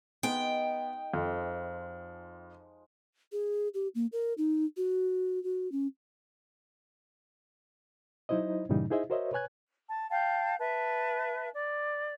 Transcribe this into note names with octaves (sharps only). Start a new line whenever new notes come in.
G#3 B3 D#4 D#5 G5
F2 F3
G#4
G4
A#3
A#4
D#4
F#4
F#4
C#4
F#3 D#4 E4 C5 D#5
G2 A#2 C#3 E3 G3 D#4
D#4 E4 G#4 C5 D#5 E5
F#4 A#4 C5 C#5 D#5 E5
B4 C#5 G#5 F#6 G#6
A5
F5 G5 A5 G6
B4 E5 A5
D5